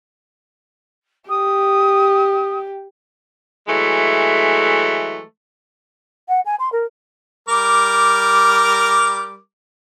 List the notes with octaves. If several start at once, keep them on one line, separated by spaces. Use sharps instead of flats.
G4 D#6
E3 F#3 G#3 A3
F#5
G#5
C6
A#4
G3 A#4 D6